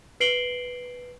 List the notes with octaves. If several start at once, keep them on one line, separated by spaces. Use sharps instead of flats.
B4 C7 D7 F#7 G7